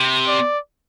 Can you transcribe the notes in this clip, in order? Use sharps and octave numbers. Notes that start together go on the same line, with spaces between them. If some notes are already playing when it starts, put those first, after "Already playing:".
Already playing: C3
D5